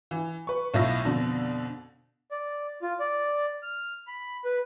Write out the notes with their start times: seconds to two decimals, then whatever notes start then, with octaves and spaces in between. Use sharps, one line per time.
0.11 E3
0.47 B4 C#6
0.74 B1 A2 E4 F4 E6 A#6
1.05 F2 B2 D3
2.31 D5
2.82 F4
3.00 D5
3.63 F6
4.07 B5
4.45 B4